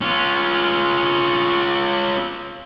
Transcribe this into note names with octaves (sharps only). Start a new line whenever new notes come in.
C#4 F4